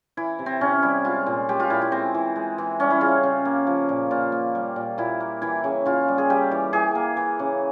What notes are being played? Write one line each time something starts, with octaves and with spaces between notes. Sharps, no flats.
E3 E4
C3
C4
C3 C#4
G3 E4
G#3 F4
A#2
G#3 G4
F4
A#2 E4
E4
G#3 C4
E3
G#3
E3
G3 C#4
E4
C#3 F4
C#3
A#3
F3
A#2
A#2 F4
A#3
G3
A#2
A#2 E4
A#3
E3 E4
C#3
C#3 F4
G3
G#4
G3 G4
E3
E3 G#4
A#3
E3
C#3